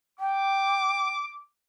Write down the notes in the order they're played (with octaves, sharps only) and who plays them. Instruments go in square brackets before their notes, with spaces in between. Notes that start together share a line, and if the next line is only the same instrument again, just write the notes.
[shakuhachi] G5 [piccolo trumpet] D6